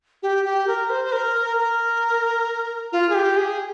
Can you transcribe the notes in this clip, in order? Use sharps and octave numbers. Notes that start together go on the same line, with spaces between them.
G4
G4
A#4
C5
C5
A#4
A#4
F4
G#4
G4
G#4